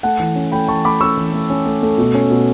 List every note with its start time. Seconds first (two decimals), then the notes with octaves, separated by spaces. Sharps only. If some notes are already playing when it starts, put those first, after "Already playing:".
0.03 A3 F#5 A5
0.20 E3
0.36 C#4
0.52 A3 G5 B5
0.68 E3 A5 C#6
0.85 A3 B5 D6
1.01 C#4 C#6 E6
1.17 E3
1.33 A3
1.50 C#4
1.66 A3
1.83 A3
1.98 B2
2.14 C#4
2.30 B2